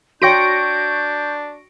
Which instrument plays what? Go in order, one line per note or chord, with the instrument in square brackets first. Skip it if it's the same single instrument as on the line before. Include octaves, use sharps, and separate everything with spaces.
[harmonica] D4 [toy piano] F#4 C#5 G5 [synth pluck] C#6 A#6 D7 [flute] G6